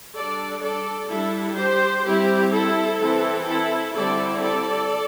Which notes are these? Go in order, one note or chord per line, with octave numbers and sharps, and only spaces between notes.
G3 D4 A4 D5
A4 D5
G3 D4 E4 A4
G4 C5
G3 C4 E4 G4
E4 A4
E3 C4 E4
E4 A4
D3 G3 C4 E4 A4 D5
A4 D5